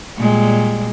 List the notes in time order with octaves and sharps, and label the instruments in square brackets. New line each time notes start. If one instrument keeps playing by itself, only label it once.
[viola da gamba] A#2 G3 G#3